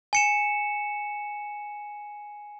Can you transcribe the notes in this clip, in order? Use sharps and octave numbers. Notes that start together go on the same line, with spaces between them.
G#5 C#7 E7